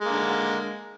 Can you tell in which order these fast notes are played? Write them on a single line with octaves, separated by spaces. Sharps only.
G#3 A#3 D3